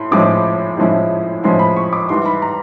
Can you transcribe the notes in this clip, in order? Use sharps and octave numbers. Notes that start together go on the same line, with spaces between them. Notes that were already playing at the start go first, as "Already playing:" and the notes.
Already playing: A2 C6
A2 F3 G#3 C#4 E4 D6
A2 F3 G#3 C#4 E4
A2 F3 G#3 C#4 E4 C6
B5
C#6
D6
G#2 E3 G3 C6
B5
A#5